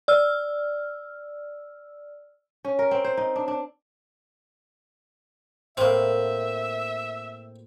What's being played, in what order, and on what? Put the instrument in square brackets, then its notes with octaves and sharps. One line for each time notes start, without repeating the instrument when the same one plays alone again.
[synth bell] D5 E6 F6
[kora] C#4
A#4
C4
C5
D#4
D4
D4
[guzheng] A2 A#3 [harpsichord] C4 [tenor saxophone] E5